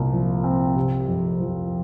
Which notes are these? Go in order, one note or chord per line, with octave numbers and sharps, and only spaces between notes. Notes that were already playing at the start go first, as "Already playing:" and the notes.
Already playing: C2 A#2
F3
C4
C3
F2
F3